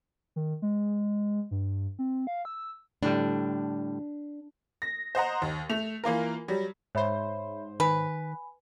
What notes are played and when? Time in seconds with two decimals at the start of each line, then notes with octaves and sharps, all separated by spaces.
0.36 D#3
0.62 G#3
1.51 G2
1.99 C4
2.27 F5
2.45 E6
3.03 A2 D3 G3 D4
4.82 A#6
5.15 C5 D#5 F#5 A#5
5.42 D#2
5.70 A3 F7
6.04 E3 A#3 F4 A#4
6.48 F#3 G3
6.95 G#2 C5 C#5 E5 B5
7.80 D#3 B4 G#5 B5